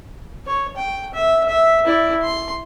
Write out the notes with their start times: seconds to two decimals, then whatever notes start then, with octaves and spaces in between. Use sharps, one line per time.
0.47 C#5
0.77 G5
1.14 E5
1.49 E5
1.85 E4 D5
2.22 C6